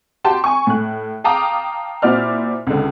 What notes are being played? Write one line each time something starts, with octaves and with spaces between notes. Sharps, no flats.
F#4 G4 G5 A5 C6
G#5 C#6
A2 F#6
F5 G5 A5 A#5 D6 D#6
A#2 E4 F#4 C5 D5 F6
C#2 D3